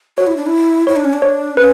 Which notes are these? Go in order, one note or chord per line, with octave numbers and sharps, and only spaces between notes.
F#4 C#5
E4
D4
E4
E4 C#5
D4
C#4
D4
C#5
C#4 B4